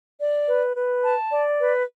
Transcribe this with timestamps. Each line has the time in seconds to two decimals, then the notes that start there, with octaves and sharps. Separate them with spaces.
0.20 D5
0.48 B4
0.76 B4
1.03 A5
1.32 D5
1.59 B4